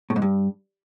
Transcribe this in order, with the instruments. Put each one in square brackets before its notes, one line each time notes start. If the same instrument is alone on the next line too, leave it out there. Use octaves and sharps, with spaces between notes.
[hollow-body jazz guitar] A2
G#2
G2